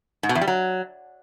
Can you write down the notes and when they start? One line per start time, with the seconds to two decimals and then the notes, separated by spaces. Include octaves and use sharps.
0.23 G#2
0.29 B2
0.35 E2
0.41 G3
0.47 F#3